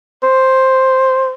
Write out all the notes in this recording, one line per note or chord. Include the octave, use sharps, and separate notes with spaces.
C5